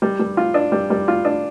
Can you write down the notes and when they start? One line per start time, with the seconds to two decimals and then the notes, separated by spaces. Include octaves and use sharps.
0.02 G3
0.19 G3
0.37 F4
0.54 D4
0.72 G3
0.90 G3
1.08 F4
1.25 D4